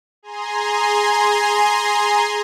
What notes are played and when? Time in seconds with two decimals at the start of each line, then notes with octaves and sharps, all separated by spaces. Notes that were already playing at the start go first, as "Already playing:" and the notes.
0.23 G#4 G#5 A#5 C6